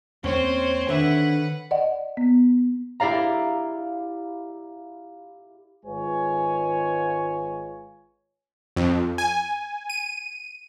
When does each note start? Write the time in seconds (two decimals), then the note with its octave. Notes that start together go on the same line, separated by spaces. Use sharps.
0.24 E2 G#3 A#3 C4 C#4 C5 C#5
0.89 D3 D#3 B4 E5 F#5
1.71 D5 D#5 F#5
2.17 B3
3.00 E4 G4 D5 F5 A#5
5.85 G#1 G#3 F4 B4 C#5 G#5
8.77 F2
9.18 G#5
9.90 D#7